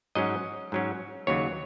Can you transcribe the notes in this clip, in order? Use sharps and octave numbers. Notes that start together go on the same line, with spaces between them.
G#2 F#3 C#4 D#5
G#2 F#3 C#4
D#2 C#3 F#3 C#5